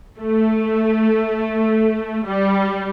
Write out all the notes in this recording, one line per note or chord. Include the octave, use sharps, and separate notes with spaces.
A3
G3